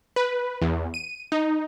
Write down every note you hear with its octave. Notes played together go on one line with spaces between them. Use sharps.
B4
E2
D#7
D#4